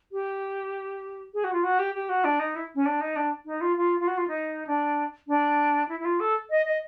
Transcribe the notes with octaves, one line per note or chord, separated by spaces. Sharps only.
G4
G#4
F#4
F4
F#4
G4
G4
F#4
D4
D#4
E4
C#4
D4
D#4
D4
D#4
F4
F4
F4
F#4
F4
D#4
D4
D4
E4
E4
F4
A4
D#5
D#5